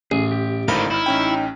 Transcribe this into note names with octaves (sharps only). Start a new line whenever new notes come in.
A1 G#4
G4
G#1 A2 D3 D#4 A#4 C5 F5 B5
D#4 E4 F6
A1 C#4 G5